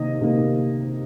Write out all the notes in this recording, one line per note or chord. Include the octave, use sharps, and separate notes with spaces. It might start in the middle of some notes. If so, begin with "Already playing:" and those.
Already playing: C3 D#3 A#3 D#5
C3 D#3 A#3